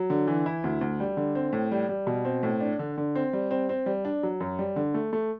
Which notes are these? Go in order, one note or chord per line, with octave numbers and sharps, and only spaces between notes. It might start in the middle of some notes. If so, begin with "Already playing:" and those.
Already playing: F#3
D3
E3
E4
D2
D2
G3
D3
C4
A2
G3
G3
B2
C4
A2
D4
D3
D3
C4
G3
C4
C4
G3
D4
F#3
F#2
G3
D3
A3
A3